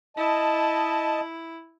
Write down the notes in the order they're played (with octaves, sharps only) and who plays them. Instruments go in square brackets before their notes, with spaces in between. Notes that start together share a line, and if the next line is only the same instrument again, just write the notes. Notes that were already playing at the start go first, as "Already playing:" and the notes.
[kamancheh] E4 [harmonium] D#5 A5